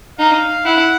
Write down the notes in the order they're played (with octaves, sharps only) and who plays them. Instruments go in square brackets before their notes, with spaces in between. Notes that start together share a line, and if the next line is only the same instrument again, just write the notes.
[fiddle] D#4 [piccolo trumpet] F5
[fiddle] E4 [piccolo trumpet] F#5